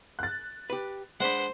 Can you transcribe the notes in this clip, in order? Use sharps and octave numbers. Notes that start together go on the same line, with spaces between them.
F#6 A6
G4 B4
G#3 D4 C5 F#5 B5